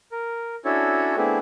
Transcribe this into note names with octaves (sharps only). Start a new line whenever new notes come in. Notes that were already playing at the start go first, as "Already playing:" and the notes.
A#4
C#4 D4 E4 F#4 A4 C#5
A3 B3 C4 D4 E4 G#4